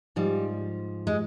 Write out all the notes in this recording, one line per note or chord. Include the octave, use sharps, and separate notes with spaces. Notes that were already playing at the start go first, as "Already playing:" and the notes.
G#2 F3 G3
G#3